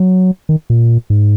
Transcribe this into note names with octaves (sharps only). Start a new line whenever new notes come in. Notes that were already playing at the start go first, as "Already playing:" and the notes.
Already playing: F#3
D#3
A#2
G#2